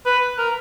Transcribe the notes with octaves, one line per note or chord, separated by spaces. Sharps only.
B4
A#4